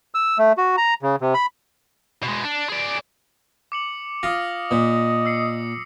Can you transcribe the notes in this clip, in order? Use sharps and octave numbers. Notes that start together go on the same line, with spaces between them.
E6
A3
F#4
A#5
C#3
C3
B5
B2 G#3
D4
G#4 D5
D6 C#7 F#7
F4 D#6 A#6
A#2 D#5
E6 C7 C#7